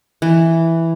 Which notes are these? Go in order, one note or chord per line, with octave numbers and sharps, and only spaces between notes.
E3